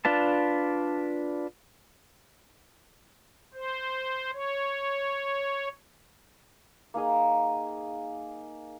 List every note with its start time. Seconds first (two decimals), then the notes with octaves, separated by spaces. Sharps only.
0.05 D4 F4 B4 A5
3.54 C5
4.33 C#5
6.94 A#3 D#4 G#4 D#5